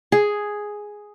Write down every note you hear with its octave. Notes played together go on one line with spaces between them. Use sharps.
G#4